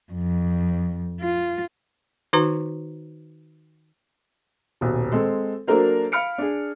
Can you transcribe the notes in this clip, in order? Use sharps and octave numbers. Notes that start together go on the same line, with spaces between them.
F2
F4
D#3 D#4 F#4 B4 A#5
D#1 B1
G#3 C4 A4
F#3 A#3 D4 A4 A#4 C5
F5 B5 F6 C#7 D7
D4 G#4